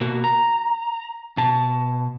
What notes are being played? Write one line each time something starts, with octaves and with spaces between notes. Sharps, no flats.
B2 A#3 F#4
A#5
B2 A5